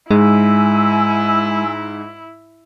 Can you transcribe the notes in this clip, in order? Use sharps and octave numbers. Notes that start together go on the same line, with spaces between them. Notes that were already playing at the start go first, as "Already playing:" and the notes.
G#2 G#3 E4 G#5 E6